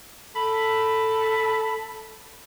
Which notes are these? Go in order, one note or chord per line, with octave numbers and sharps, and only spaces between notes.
A4 B5